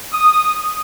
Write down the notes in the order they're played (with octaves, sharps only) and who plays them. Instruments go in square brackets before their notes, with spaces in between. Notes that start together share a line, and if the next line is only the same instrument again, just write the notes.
[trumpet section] D#6